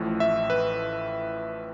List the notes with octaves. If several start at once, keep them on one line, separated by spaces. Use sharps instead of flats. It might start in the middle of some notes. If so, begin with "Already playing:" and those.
Already playing: A1 A2 F3
E5
B4